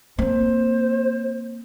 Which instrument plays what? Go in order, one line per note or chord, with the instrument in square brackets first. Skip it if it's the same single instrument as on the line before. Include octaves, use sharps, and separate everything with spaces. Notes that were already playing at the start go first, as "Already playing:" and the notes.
[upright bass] A#3 C4 [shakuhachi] C5